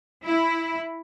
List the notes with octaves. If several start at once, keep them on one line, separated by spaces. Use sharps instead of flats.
E4